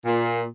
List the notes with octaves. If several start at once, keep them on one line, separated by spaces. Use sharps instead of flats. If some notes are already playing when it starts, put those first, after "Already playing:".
A#2